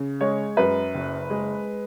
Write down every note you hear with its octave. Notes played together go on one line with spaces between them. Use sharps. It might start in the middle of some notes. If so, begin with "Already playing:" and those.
Already playing: C#3
G#3 C#5
F#2 B4
F#1
G#3